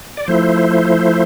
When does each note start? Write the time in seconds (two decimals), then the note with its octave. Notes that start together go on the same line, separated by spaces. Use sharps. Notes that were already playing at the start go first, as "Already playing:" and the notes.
0.17 D5
0.27 F3 A3 E4 C5